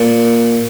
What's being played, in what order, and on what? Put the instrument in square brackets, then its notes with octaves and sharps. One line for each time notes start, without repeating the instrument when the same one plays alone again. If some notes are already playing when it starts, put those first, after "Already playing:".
Already playing: [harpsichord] A#2